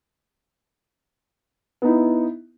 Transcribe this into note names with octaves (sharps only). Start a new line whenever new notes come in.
B3 D#4 E4